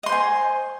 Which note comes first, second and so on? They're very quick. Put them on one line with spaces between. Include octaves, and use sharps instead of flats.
D#5 C6 C5 G#5